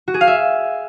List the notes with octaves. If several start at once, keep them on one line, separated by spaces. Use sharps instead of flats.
F#4
G#4
F5
E5